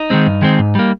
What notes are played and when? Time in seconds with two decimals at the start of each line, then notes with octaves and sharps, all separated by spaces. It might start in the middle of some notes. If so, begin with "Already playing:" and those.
Already playing: D#4
0.10 D#3 G#3 C4
0.27 G2
0.42 D#3 G#3 C4
0.59 G#2
0.75 G3 A#3